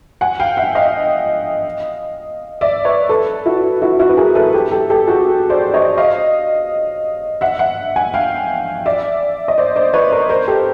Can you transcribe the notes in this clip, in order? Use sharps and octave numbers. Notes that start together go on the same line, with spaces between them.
F#5 G#5
F5 G5
E5 F#5
D#5 F5
D5 E5
B4 C#5
A4 B4
E4 F#4
E4 F#4
E4 F#4
B4
G#4 A#4
A4 B4
G4 A4
G4 A4
G4 A4
F#4 G#4
C5 D5
C#5 D#5
D#5 F5
E5 F#5
E5 F#5
F#5 G#5
F5 G5
D5 E5
D#5
C5 D5
C5 D5
B4 C#5
A#4 C5
A#4 C5
G4 A4